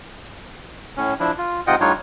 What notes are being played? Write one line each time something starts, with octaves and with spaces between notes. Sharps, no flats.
A2 C#4
F3 D4 E4
F4
G#2 C3 F4 D#5 F#5 G5
A2 G3 D4 D#4 F4 C#5